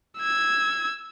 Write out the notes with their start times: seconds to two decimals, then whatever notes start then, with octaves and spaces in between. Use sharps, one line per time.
0.19 E6 G#6